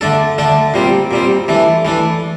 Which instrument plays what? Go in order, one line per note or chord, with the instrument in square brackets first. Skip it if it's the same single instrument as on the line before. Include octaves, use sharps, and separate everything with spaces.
[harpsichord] D3 A3 D4 A4
D3 A3 D4 A4
A#2 G3 C4
A#2 G3 C4
E3 A3 D4
E3 A3 D4